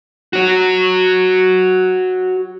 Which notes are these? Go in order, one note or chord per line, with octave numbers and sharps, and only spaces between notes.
F#4 C#5